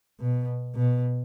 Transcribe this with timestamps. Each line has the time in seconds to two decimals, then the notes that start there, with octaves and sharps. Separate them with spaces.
0.20 B2
0.75 B2